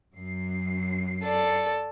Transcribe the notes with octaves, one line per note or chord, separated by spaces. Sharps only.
F#2 C7
A4 D5